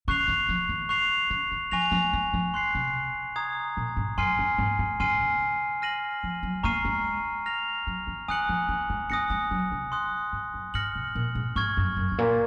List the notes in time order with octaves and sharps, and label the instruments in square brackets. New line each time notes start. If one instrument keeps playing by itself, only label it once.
[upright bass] C#3 [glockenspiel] C#6 F#6 C7 F7
[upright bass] D#3
F3
D#3
[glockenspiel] C#6 F#6 C7 F7
[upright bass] C#3
D#3
[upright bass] F3 [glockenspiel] G#5 C#6 F#6 A#6 F7
[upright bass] F3
G#3
F3
[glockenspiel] C6 F#6 C7
[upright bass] C3
[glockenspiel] A#5 D#6 G#6
[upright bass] A#2
G#2
[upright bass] F#2 [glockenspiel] G#5 C6 F6 C7 D#7
[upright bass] G#2
G#2
G#2
[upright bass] C#3 [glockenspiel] G#5 C6 F6 C7 D#7
[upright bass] C#3
[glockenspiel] F6 A#6 D#7 F#7
[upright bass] F3
F#3
[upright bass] A#3 [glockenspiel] A#5 C#6 F6 C7 D#7
[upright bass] G#3
[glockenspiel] F6 A#6 F7
[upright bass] F#3
D#3
[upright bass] D#3 [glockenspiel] G#5 D#6 F#6 C#7 F#7
[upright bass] F3
A#3
G#3
[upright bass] A#3 [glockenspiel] G#5 D#6 F#6 A#6 C#7
[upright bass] G#3
F#3
C3
[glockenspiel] C6 D#6 F#6
[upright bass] G#2
F#2
[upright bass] G#2 [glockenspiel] F6 A#6 C#7 F#7
[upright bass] C3
A#2
G#2
[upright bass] G#2 [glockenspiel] C#6 F6 G#6
[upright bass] F#2
F#2
G#2
A#2